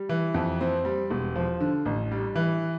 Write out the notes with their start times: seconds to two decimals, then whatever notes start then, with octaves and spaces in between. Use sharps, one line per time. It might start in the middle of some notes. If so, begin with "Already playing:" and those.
Already playing: G3
0.09 E3
0.34 F2
0.61 C4
0.85 G3
1.10 E1
1.35 F3
1.60 D3
1.85 A1
2.12 G3
2.35 E3